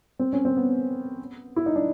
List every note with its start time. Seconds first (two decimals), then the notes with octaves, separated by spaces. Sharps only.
0.19 C4
0.33 C#4
0.45 C4
0.57 B3
1.56 E4
1.66 D#4
1.76 D4